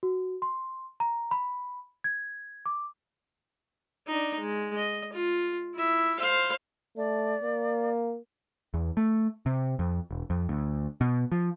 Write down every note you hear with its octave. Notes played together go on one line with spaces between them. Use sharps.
F#4
C6
A#5
B5
G#6
D6
D4 D#4
G#3
D#5
F4
E4 E5
C5 F5
A3 D5
A#3
E2
A3
C3
F2
E1
F2
D2
B2
F3